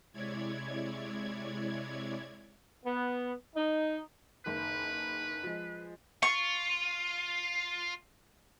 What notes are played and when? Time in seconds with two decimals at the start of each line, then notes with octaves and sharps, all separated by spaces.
0.13 C3 G#3 E4 C#5 D5 G#6
2.85 B3
3.56 D#4
4.46 F#1 D#3 B4
5.44 F3 G#3
6.23 F4 C#6